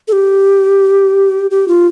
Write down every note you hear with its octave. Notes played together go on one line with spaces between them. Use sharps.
A4
G4
G4
F4